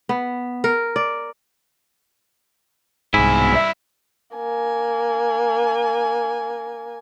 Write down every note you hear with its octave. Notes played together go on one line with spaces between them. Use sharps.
B3
A#4
D5
C2 G#2 B2 E4 G#5
G2 E5
A#3 G#5